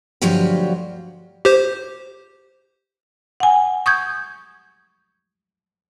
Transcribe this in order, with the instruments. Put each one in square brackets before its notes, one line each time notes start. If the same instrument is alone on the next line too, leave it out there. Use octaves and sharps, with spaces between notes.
[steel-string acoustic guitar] D2 G2 F3 F#3 G4 F5
[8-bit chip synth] G4 C5
[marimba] F#5 G#5
C#6 D#6 G6 G#6